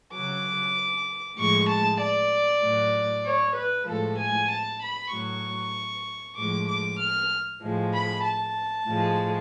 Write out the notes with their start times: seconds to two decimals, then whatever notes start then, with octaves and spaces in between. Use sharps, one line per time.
0.13 C#3 F#3 D6
1.38 A2 F3 G#3 C#6
1.69 A5
2.00 D5
2.63 A2 F#3
3.26 C#5
3.56 B4
3.88 A2 F3 G#3 A4
4.18 G#5
4.50 A5
4.82 B5
5.12 A2 F#3 C#6
6.37 A2 F3 G#3 D6
6.68 D6
7.00 F6
7.62 A2 F3 G#3
7.93 B5
8.24 A5
8.87 A2 F3 G#3